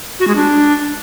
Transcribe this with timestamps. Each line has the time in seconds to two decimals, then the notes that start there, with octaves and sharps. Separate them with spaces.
0.20 F#4
0.28 G#3
0.36 D4